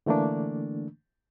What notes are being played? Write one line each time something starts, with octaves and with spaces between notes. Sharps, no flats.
D3 E3 A3 A#3 D4